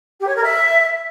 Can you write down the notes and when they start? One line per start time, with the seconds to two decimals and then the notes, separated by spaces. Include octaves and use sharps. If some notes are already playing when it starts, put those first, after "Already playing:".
0.20 G4
0.27 C#5
0.35 A#4
0.42 E5